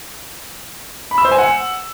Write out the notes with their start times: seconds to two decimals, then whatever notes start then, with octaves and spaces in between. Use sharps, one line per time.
1.11 B5
1.18 E6
1.25 C5
1.31 G#5
1.38 F#5